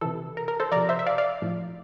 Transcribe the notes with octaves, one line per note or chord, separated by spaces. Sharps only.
C3 E3 A4
A#4
A#4
A4 C5
C3 F3 A#4 D5
C5 E5
E5
D5 F5
D5 F5
A2 F3